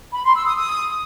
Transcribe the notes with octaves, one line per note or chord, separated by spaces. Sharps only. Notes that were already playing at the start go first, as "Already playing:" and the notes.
B5
C6
E6
D#6
D#6